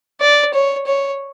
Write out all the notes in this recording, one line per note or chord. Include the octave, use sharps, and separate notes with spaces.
D5
C#5
C#5